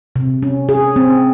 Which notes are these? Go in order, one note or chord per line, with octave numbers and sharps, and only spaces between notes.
C3
C#4
G#4
C4